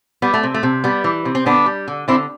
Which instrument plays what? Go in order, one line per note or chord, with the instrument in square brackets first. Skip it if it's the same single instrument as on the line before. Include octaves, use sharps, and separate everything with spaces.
[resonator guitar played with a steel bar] G3 B3
A3
C3
A3
C3
G3 B3
E3
C3
C4
D3 B3 D4
G3
D3
D3 C4 E4